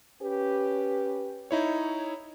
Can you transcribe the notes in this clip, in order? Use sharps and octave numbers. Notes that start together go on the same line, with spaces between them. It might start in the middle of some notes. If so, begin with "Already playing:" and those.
C#4 G4 B4
D#4 E4 C#5